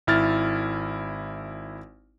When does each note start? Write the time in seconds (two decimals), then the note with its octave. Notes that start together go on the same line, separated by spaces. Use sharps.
0.07 G#1 E4 F6 A6